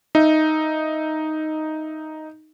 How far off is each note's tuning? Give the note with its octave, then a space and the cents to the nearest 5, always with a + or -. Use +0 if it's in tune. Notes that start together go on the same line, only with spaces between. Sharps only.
D#4 +0 E5 +0